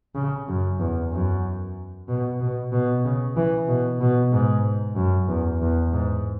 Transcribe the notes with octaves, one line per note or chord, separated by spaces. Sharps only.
C#3
F#2
E2
F#2
B2
B2
B2
C#3
E3
B2
B2
G#2
F#2
E2
E2
G#2